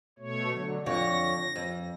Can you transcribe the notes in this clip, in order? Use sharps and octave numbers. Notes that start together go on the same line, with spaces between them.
B2 A3 C#5
D3 F#3
F2 D3 C#5 A#6
F2